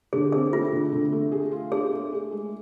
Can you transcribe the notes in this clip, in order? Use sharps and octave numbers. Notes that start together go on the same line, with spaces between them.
D3 G#4
C4 G#4
A3 F4
D3
D3
A3
G#4
F4
D4 G#4
A3
G#4
G#3